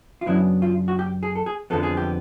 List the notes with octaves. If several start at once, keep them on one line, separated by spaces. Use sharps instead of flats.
F4
F#2 C#3 F#3 B3 D4 E4
F4
F#4
G4
G#4
A4
G#4
F2 D3 F3 G#3 B3 A4
G#4
G4